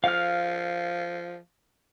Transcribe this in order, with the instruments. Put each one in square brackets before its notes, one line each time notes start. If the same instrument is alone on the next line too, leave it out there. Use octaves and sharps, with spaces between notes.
[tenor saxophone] F3 [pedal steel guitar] F5 F6